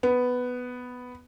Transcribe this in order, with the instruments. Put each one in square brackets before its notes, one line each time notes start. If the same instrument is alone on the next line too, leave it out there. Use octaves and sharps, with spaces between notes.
[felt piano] B3